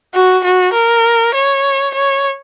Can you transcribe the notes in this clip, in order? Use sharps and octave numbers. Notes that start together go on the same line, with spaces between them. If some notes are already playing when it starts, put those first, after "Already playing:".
F#4
F#4
A#4
C#5
C#5